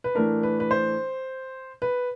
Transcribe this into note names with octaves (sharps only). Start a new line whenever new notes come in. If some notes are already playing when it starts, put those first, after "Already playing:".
B4
A2 E3 A3 D4 A#4
B4
B4
C5
B4